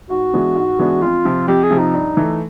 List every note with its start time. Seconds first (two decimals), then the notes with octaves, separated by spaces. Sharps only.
0.10 G#2 F#4
0.33 E3 G#3 B3 D4
0.56 G#2
0.79 E3 G#3 B3 D4
1.02 F2 F4
1.25 C3 F3
1.48 F2 G4
1.63 G#4
1.70 C3 F3
1.78 D#4
1.94 G2
2.17 E3 A3